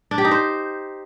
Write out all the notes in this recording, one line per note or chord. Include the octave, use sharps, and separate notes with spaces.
D4
G4
D#4
C5